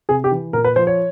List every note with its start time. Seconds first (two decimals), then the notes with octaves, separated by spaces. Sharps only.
0.09 C3 G#4
0.24 G4
0.31 E3
0.53 A#2 A#4
0.64 B4
0.76 F3 C5
0.87 C#5